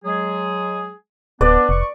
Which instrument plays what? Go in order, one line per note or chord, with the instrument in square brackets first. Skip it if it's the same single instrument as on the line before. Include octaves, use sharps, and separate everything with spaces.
[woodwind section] F#3 G#3 G#4
[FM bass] D1 [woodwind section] B3 D4 [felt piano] B4 [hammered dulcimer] D5
[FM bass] F1 [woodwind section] C#6